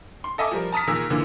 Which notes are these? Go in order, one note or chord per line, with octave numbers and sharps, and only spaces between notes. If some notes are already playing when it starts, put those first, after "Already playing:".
C6
A4 D#5 E5 G#5 D6
F3 G3 A#4
A5 A#5 D#6 F6 B6
A#2 D#3 G#4 A#4 E6
A#2 D3 E3 A#3